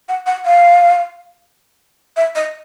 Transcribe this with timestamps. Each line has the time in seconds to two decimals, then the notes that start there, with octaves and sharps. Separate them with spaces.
0.09 F#5
0.26 F#5
0.45 F5
2.16 E5
2.35 D#5